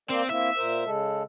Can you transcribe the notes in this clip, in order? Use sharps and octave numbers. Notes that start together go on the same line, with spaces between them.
A#3 C4 A#4 D5
A#3 C4 E4 E5
A#2 A#4 C5
C#3 G#3 A4